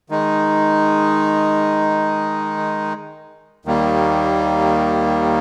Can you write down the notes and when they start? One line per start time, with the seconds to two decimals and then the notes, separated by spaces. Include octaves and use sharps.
0.10 D#3 G#3 D#4
3.65 D#2 D#3 G3 A#3